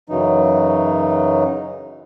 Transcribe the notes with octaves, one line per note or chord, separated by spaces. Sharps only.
F#2 C#3 E3 F#3 D#4